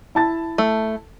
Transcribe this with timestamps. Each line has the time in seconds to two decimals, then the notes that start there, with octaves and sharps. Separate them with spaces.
0.15 E4 A5 A6
0.58 A3